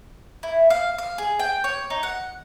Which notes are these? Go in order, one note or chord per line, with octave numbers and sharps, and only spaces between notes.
E4
F5
F5
G#4
G5
C#5
D#4
F#5